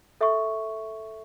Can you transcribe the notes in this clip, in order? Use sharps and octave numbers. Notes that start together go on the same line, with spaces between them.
A4 E5 C#6